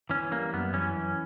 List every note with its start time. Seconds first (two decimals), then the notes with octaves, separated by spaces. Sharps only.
0.10 E3 C#4
0.32 G3 A#3
0.53 F#2 B3
0.74 E3 C#4
0.96 F#2